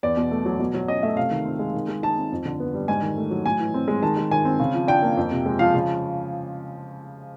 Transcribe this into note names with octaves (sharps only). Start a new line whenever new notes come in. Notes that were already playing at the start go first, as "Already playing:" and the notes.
E2 D5
B2
A3
F#3
B2
F#3
C#4 D#5
A3 E5
C3 F5
D#3
C4
G#3
D#3
G#3
D#4 A5
C4
F2
D3
B3
G3
G#2 G#5
D#3
A3
F#3
A2 G#5
E3
C4
G#3
D#3 A5
G#3
D#3 G#5
C4
C#3
F3
D4 G5
A#3
F2
C3
G#3
F3 F5
C#3